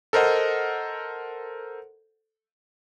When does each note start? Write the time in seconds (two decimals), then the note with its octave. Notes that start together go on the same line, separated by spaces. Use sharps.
0.13 A4 A#4 C5 D#5 F#5